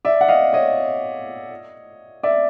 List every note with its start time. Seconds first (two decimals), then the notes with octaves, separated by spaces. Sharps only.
0.05 D5 E5
0.21 F#5
0.29 D#5 F5
0.53 C#5 D#5
2.23 D5 E5